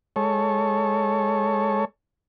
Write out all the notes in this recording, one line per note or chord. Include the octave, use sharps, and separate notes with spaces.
G#3 A4 C#5